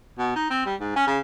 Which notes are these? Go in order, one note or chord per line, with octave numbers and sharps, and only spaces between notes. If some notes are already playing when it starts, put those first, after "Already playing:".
B2
D#4
C4
G3
G#2
C#4
C#3